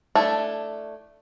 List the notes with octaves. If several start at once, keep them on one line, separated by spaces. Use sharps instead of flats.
A3 D4 E4